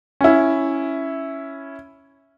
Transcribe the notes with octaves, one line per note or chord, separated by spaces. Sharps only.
C#4 E4